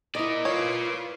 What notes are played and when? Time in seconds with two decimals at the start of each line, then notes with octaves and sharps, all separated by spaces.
0.15 E4 A#4 D5 D#5
0.45 F4 B4 C#5